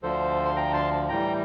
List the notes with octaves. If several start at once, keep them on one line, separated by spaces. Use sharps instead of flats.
D2 D3 F3 A4 C5
C6
G5 A#5
A5 C6
A2 E3 G3 G5 A#5